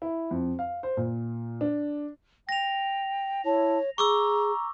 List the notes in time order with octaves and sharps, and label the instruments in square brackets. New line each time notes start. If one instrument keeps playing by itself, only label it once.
[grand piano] E4
F2
F5
C5
A#2
D4
[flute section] G5 [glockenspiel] A#6 F7
[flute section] E4 A5 [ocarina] C#5
[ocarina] G#4 [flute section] A#5 [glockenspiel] C#6 D6 E6